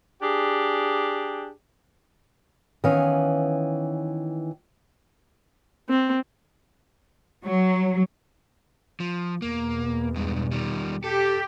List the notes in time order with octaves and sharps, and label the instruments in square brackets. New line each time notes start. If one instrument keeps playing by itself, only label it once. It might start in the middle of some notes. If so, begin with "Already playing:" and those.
[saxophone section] D4 G4 G#4
[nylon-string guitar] D#3 E3 B3 C#4 F5
[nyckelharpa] C4
[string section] F#3
[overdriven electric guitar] F3
[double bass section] E2 B2 [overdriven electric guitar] A#3
[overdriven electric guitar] G2 G#3
D#3 G3
[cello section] G4 [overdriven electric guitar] A4